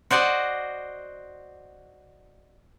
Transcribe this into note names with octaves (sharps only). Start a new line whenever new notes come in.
F#4 C5 D5 D#5 F#5